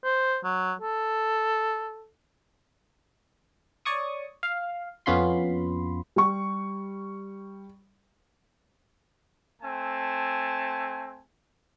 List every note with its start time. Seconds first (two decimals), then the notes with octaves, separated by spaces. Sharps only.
0.04 C5
0.44 F#3
0.81 A4
3.85 C#5 D5 C#6 D#6
4.43 F5
5.06 F2 B3 C#4 F4 B5 C6
6.16 G3 C#6
9.62 A3 C4 G#5 A5